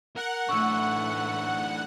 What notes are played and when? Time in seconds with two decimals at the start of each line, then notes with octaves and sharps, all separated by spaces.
0.16 A#4 F#5
0.49 A2 D3 E3 A3 C#6 E6